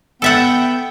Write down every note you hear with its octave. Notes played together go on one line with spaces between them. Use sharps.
B3 A4 E5 F#5 G5